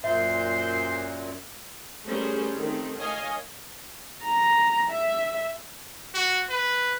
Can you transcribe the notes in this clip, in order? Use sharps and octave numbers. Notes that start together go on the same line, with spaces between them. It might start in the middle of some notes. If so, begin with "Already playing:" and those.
F#2 A#2 C5 E5
G3 A3 C#4 G#4 A#4 C5
D#3 A3 C4
C#5 D#5 F5 G#5
A#5
E5
F#4
B4